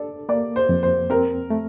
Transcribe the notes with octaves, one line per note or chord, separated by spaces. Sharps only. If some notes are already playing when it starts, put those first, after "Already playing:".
Already playing: D4 A4 D5
A#3 D5
C5
F2
C5
C4 A#4
A3